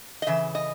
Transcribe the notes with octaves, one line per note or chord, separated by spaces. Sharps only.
D#5
C#3 E3 E5
D#5